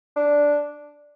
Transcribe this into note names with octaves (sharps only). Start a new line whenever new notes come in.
D4